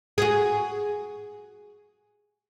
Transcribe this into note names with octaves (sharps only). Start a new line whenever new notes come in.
F#4 G#4